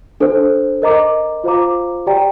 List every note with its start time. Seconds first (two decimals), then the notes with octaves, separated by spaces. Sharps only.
0.20 D4 A4 C5
0.82 A#4 D#5 A#5 D6
1.44 F4 C5 F5 A#5 D6
2.06 G4 D5 G5 A#5